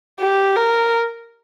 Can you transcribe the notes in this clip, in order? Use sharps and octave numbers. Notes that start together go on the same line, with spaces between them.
G4
A#4